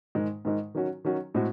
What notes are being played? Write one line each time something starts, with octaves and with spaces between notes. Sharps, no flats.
G#2 D#3 G#3
G#2 D#3 G#3
D#3 F#3 C#4 F#4
D#3 F#3 C#4 F#4
A2 G#3 C4 F#4